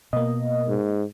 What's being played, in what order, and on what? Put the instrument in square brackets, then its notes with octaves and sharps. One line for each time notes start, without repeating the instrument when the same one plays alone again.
[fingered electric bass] B2 [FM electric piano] A#3 D#5
[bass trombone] G#2